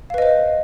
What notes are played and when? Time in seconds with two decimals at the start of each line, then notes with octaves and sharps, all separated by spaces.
0.10 F5
0.14 B4
0.18 D#5
0.22 C5